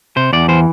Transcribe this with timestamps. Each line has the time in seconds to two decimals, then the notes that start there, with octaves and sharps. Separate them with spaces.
0.17 C3 C5
0.33 E2 D5
0.48 E3 C5